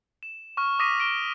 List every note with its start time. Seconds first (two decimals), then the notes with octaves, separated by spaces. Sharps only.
0.23 E7
0.57 C#6 F6
0.79 D6 D#6 A#6 B6 D#7
1.00 D7 G7